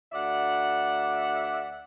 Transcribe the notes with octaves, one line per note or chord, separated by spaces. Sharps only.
D2 D5 E5 F#5